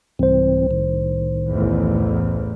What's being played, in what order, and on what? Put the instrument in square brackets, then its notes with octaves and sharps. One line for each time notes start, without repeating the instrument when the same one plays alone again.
[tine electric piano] C2 C5 [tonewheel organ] G#2 E3 C4
[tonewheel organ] A2 D#3
[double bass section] A1 E2